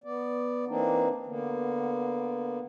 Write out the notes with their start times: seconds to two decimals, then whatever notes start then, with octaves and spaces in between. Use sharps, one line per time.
0.04 B3 D5
0.68 E3 A#3 C4 D4 D#4
1.26 D3 A#3 B3